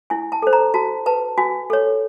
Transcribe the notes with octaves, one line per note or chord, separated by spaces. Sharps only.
E4 G#5
A5
A4 C5
A#5
F#4 A5
B4 A5
F#4 G#5
A4 C#5